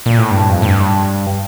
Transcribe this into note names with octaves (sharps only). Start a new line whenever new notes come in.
A#2
A2
G2
F2
A2
G2